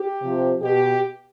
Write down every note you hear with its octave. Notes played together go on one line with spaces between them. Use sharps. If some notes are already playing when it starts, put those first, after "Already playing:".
Already playing: G4
C3 F3
B2 G4